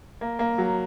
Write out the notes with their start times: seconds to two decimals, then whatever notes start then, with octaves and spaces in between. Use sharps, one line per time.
0.21 A#3
0.39 A#3
0.58 F#3